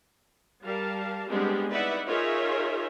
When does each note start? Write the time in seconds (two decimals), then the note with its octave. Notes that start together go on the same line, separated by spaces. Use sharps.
0.64 G3 A#4 F5 A5
1.28 G3 G#3 B3 C4 D4 G4
1.70 D#4 E4 B4 D5 E5 F#5
2.07 D#4 F4 G#4 A#4 C#5 E5